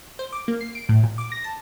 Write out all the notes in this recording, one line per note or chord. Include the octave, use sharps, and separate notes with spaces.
C5
D6
A#3
C7
D7
A2
A#2
D6
A#6
A5